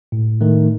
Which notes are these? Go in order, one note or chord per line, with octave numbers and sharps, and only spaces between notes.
A2
D#3 A3